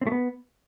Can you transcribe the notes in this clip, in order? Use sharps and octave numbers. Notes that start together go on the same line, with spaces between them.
C4
A3
B3